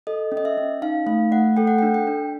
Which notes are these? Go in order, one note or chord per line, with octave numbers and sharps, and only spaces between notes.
A4 D#5
C#4
D#5
E5
C#4
D#4 F5
A3 F5
A3 F#5
A4 G5
F#5
D4 G5
G5
D4